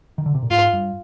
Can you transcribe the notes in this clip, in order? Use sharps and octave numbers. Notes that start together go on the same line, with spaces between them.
D#3
D3
C3
A#2
G#2 F4
G2